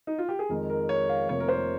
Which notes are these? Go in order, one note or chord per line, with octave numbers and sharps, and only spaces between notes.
D#4
F4
G4
G#4
F2 D#3 G#3 A#4
A#4
C#5
F5
F1 F2 C3 F3 A#3 C#5
A#4
C5